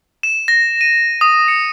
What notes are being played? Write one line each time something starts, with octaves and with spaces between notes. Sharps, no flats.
E7
A#6
D#7
D#6
C#7